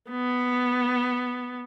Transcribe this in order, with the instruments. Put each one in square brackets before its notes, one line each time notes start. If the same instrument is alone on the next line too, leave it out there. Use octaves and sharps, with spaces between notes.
[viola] B3